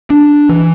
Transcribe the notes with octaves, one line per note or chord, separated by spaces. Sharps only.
D4
E3